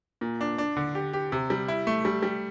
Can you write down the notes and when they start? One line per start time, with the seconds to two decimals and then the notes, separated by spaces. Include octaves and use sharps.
0.21 A#2
0.41 D4
0.58 D4
0.77 D3
0.95 G4
1.13 G4
1.32 C3
1.50 G3
1.68 E4
1.87 A3
2.05 G3
2.23 G3